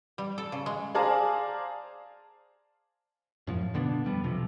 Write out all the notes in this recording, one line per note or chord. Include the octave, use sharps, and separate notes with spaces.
G3
A4
C#3
G#3
G#4 C5 D5 F5 A5 A#5
F#2 A2 F3
B2 D3 B3 D4
F2 G3 B3
B1 C3 F3